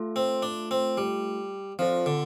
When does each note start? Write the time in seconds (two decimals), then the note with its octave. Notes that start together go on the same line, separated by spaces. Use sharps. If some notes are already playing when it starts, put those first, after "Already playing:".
Already playing: A3 F4 A4
0.16 C4
0.42 D4
0.71 C4
0.97 G3
1.79 F3 C4 F4 A4 D5
2.06 D3